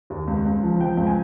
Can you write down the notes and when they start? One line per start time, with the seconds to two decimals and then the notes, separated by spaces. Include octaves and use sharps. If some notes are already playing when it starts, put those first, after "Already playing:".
0.10 D#2
0.28 C#2
0.45 C#2
0.63 F3
0.80 F3 G5
0.97 C#2
1.07 G#5